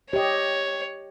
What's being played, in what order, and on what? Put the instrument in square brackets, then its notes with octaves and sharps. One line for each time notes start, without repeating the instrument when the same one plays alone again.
[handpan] G4 D#5 [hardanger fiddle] C#5